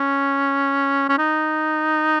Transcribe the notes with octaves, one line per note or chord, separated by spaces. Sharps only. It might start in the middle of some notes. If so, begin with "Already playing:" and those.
Already playing: C#4
C#4
D#4